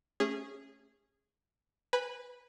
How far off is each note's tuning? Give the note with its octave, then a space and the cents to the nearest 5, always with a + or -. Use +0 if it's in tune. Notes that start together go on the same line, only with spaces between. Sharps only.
A3 +0 C#4 -15 G#4 -15
B4 +0 G#5 -25 B5 -15